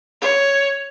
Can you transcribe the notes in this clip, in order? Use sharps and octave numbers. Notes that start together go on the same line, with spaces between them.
C#5